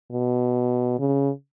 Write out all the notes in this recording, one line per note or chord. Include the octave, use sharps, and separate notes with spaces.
B2
C#3